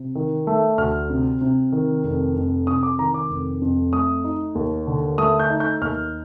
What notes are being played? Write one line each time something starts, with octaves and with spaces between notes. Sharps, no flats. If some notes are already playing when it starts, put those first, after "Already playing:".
Already playing: C3
D#3
A3
D2 F6
C3
C3
D#3
F1
F2
C3 D#6
D6
D#3 A#5
D6
F1
F2
A3 D#6
D#4
D#2
D3
A3 D#6
G6
D#4
G6
D#2 F6